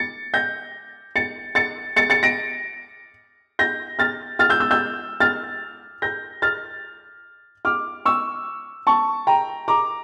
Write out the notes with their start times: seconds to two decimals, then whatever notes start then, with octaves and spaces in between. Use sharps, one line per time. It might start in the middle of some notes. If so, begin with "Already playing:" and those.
Already playing: A6 C#7
0.34 G6 A#6
1.16 A6 C#7
1.55 A6 C#7
1.96 A6 C#7
2.10 A6 C#7
2.23 A#6 D7
3.59 G6 A#6
3.99 F6 A6
4.39 F6 A6
4.50 E6 G6
4.60 E6 G6
4.71 E6 G6
5.20 F6 A6
6.02 G6 A#6
6.42 F6 A6
7.65 D6 F6
8.05 C#6 E6
8.87 A5 C#6
9.27 G5 A#5
9.68 A#5 D6